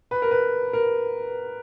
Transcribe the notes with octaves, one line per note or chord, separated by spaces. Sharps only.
B4
A#4
B4
A#4